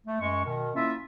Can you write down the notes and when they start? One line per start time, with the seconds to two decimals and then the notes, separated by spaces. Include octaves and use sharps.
0.07 A3
0.21 F#2 G#3 C#6
0.45 B2 D#3
0.75 A#3 C#4 E4 F4 E5